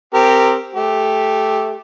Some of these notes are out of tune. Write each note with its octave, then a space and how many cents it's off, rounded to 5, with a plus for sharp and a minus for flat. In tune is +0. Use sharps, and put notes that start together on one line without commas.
C4 +0 G4 +0 A#4 -20
A3 -10 G4 +5